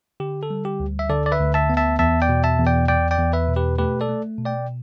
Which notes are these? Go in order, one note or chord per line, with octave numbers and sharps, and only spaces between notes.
D3 G4
A4
G3
G4
D2
E5
D3 A4 D5
D5
B4 E5
D2
E5 A5
B3
E5 A5
E2 E5 A5
D5 G5
B2
E5 A5
E2
D5 G5
E2 D5 G5
D5 G5
E2
B4 E5
B2
G4 B4
A3 G4 B4
A4 D5
A3
B2
D5 G5